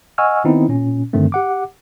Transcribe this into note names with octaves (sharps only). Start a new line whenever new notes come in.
D#5 F#5 G#5 C#6 E6 F6
D#3 B3 C4 D#4 E4
A#2 C#4
G2 D3 D#3 A3 C4
G4 F#5 D6